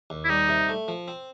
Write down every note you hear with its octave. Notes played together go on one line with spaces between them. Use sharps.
D#2
E4
G3 D#4
C3
A3
F3
C4